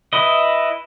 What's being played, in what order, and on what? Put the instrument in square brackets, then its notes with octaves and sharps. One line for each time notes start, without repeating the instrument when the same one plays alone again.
[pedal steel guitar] E4 B4 D#5